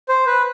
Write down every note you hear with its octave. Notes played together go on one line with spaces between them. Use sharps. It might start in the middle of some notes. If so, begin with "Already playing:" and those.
C5
B4